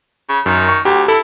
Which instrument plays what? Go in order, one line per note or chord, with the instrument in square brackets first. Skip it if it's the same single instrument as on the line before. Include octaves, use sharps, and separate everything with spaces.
[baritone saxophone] C#3
[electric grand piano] F#2 [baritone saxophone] D#3
[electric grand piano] C#6
[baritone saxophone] D2 [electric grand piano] G4
[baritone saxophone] E4 [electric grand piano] A4